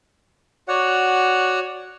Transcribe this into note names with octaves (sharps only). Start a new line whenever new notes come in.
F#4 C#5 D5 F#5